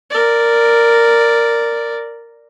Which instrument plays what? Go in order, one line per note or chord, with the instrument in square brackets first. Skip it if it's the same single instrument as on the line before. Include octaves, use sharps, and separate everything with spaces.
[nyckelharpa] A#4 D5